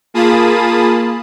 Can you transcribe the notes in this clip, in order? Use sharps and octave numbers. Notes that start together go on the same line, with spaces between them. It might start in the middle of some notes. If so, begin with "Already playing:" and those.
A#3 F4 G#4 A5 B5 D#6